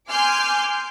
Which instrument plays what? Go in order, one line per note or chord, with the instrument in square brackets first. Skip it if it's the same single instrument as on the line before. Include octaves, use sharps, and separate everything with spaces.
[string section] G#5 C6 D6 F6 G6